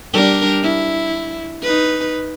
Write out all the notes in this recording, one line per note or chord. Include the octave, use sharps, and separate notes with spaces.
G3 D4 A#4
E4
D#4 B4